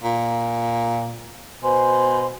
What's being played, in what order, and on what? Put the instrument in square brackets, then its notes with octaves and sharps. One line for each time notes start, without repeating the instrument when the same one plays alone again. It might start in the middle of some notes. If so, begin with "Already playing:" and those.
[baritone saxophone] A#2
[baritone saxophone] B2 [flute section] C5 G#5 C6